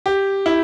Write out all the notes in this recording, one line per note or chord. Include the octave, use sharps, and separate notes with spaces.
G4
E4